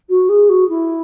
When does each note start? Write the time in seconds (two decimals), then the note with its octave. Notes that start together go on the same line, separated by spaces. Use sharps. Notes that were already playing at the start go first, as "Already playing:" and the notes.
0.09 F#4
0.29 G#4
0.49 F#4
0.69 E4